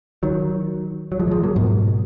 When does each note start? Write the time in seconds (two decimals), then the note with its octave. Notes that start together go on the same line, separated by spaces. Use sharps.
0.23 D#3 F#3
1.12 F#3
1.20 F3 G#3
1.28 F#3
1.31 F3 G#3
1.44 F#3 A#3
1.56 G#2 B2